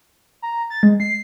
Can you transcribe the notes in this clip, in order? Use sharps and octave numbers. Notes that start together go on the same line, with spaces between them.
A#5
A6
G#3
C7